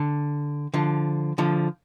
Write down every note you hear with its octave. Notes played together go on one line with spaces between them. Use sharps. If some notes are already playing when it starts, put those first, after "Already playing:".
Already playing: D3
D3 F3
D3 F3